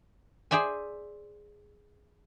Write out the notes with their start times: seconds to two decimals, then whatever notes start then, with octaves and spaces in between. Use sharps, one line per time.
0.51 G#4 C5 D5 E5 G#5